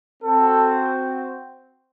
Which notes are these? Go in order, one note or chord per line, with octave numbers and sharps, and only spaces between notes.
C4 F#4 A4